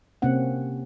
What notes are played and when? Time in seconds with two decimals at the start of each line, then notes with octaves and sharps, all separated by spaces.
0.22 C3 A#3 C4 C#4 F#5